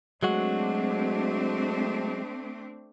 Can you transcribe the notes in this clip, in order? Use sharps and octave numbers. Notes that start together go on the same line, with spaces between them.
F#3 G#3 A3 C4 D4 F#4